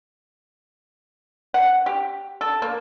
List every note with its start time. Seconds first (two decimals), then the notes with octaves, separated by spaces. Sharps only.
1.54 F#5
1.86 G4
2.41 A4
2.62 A#3